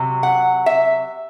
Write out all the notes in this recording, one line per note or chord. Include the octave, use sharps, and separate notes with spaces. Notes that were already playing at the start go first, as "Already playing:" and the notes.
Already playing: C3 F#3
F#5
E5